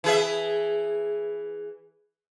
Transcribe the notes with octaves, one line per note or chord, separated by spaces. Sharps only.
E3 G#4 E5